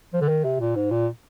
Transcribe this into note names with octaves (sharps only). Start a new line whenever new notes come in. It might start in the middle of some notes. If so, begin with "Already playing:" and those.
F3
D3
D#3
C3
A#2
G#2
A#2